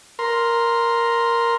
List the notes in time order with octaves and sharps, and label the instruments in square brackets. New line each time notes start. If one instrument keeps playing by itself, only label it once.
[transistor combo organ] A#4 C6